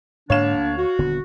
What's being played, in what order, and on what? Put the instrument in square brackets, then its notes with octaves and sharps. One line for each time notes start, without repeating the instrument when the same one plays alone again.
[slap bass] G#2 [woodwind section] D3 A#3 D4 [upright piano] C#5 F5 E7
[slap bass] D2
[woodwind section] F#4
[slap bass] D#1 D3 B3